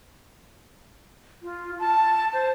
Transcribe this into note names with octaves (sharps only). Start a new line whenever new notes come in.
F4
A5
C5